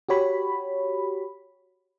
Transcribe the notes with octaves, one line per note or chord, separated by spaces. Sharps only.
F#4 G4 C#5 B5